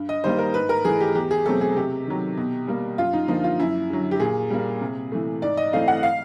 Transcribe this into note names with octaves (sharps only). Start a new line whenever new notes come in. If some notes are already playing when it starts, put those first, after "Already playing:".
Already playing: G2
D#5
D#3 G3 A#3 C5
A#4
G#2 B4
A#4
E3 A3 G#4
G4
E2 G4
G#4
B2 F#3 A3 C4 A4
G#4
C3 G4
D#3 F#3
B2
G3 A#3
F#2 F4
D#4
D3 F3 A#3 D#4
F4
F#2 E4
D3 F#3
G4
A#2 G#4
G3 A#3
C3
E3 A3
G#2 D5
D#5
E3 A3 C4 F5
F#5
F5